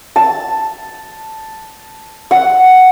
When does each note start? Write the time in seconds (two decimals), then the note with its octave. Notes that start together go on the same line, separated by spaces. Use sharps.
0.16 A5
2.31 F#5